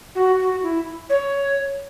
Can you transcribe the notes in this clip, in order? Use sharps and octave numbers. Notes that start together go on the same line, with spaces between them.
F#4
F#4
E4
C#5